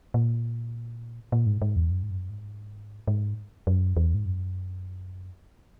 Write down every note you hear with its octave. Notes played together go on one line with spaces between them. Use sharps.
A#2
A#2
G#2
G#2
E2
F#2
G#2
F#2
G#2
G#2
F#2
E2
G#2
F#2